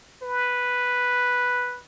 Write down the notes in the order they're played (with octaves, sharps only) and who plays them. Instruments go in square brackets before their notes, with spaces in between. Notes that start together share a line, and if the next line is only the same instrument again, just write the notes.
[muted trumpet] B4